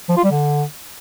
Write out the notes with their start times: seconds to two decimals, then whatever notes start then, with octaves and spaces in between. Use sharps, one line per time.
0.09 F3
0.17 F4
0.24 G3
0.31 D3